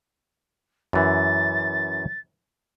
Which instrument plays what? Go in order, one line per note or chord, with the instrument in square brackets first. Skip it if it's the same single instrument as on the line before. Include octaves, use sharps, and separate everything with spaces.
[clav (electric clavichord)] F#2 E3 [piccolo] A6